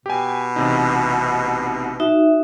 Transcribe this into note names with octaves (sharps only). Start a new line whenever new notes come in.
B2 G4 G#5
A1 C3 D#4
D#4 F#4 E5